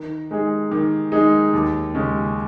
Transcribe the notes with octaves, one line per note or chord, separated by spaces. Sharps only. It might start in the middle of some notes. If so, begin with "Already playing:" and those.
Already playing: D#3
G#3 D#4 G#4
D#3
G#3 D#4 G#4
D#2
C#3 G#3 C#4